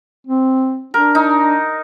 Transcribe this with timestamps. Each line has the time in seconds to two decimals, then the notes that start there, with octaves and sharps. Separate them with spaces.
0.27 C4
0.94 D4 A#4
1.15 D#4